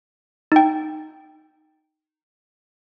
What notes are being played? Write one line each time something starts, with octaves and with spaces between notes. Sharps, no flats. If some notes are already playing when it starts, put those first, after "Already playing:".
D#4 G5